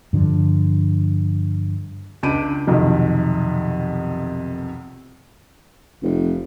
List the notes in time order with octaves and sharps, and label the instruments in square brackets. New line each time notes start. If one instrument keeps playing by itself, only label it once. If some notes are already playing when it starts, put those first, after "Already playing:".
[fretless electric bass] G2 D3 F3
[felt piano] C#2 D4 B5 G6 D7 D#7
B1 F2 C3 D#3
[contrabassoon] F1